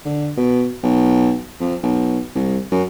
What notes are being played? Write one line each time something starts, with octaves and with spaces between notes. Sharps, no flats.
D3
B2
B1
F2
B1
C2
F#2